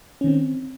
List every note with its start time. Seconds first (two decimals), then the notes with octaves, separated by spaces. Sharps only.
0.21 C#4
0.24 D#3
0.27 C4